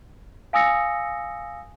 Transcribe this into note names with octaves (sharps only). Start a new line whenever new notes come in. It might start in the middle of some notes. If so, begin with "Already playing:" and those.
F5 G#5 D#6 E6 A#6 C#7